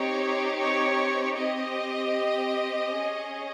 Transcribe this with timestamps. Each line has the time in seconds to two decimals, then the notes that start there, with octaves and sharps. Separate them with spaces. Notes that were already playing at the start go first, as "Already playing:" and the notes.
Already playing: C4 D#4 G4 C#5
0.58 C#5
1.37 C4 G4 D#5
2.95 C#4 G#4